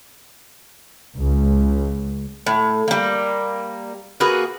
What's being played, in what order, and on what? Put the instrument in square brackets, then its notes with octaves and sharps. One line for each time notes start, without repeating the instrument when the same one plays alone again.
[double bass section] C#2
[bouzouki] A2
G3 A#3
A#3 F#4 G#4 B4